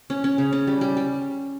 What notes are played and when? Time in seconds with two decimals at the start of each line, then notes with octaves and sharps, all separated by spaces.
0.10 C#4
0.24 C#4
0.38 C#3
0.53 C#4
0.67 G3
0.81 G3
0.97 G3